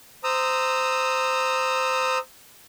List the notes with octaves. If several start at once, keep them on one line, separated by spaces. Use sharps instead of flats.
C5 A#5 D#6 E6